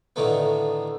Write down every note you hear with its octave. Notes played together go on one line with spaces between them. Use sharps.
A2 D3 D#3 A3 B3